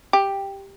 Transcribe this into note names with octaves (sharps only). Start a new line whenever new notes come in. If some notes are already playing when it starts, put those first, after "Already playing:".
G4